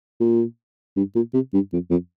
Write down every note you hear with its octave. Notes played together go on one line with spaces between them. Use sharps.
A#2
G2
A#2
C3
G2
F2
F2